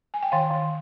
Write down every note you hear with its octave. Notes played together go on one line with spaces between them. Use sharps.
G#5
G5
D#3 F5
D#3